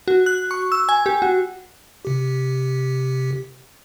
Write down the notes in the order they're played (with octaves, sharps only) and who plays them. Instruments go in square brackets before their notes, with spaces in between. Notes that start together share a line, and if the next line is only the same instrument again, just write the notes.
[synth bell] F#4
F#6
C#6
E6
G#5
G4
F#4
[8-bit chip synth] C3 G4